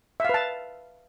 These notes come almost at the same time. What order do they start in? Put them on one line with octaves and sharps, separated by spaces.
E5 F5 B4 A5